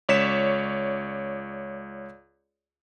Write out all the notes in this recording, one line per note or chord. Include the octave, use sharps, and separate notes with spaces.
C#2 C#5 D5 B6 E7